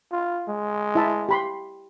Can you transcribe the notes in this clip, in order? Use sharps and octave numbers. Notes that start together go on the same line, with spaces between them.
F4
G#3
E4 E5 A5
G4 B5 C6